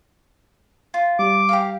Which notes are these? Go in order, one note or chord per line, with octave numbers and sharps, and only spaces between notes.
F4
G3 D6
G4 A#4 F5